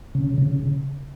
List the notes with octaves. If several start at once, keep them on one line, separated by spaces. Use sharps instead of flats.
C#3
C#3